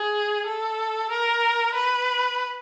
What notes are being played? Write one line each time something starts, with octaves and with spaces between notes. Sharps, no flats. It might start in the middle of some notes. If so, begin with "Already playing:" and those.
Already playing: G#4
A4
A#4
B4